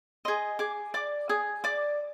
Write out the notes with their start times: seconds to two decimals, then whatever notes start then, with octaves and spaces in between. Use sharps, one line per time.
0.25 G#4 D#5 C6
0.59 G#4 D6
0.94 D5 D6
1.29 G#4 D#6
1.64 D5 D6